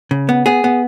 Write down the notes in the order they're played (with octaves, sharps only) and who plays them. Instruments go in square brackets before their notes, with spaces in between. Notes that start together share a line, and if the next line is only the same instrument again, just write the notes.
[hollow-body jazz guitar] C#3
B3
B3 G#4
B3